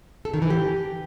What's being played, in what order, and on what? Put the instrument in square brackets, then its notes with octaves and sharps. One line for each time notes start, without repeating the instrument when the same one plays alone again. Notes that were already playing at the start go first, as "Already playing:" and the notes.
[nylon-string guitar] A4
D#3
E3
G4